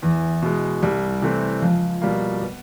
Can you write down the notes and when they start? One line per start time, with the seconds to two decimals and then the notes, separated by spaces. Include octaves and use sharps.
0.02 E2 E3
0.42 B2 G#3
0.82 C2 G3
1.22 C3 E3 A3 C4
1.62 C#2 F3
2.02 B2 G3 A#3
2.42 B3